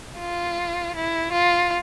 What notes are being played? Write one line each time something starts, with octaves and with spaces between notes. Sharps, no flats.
F4
E4
F4